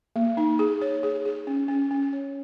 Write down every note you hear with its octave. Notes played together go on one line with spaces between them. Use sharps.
A#3
D#4
G#4
C#5
G#4
G#4
C#4
C#4
C#4
C#5